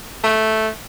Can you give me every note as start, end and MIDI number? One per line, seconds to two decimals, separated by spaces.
0.24 0.69 57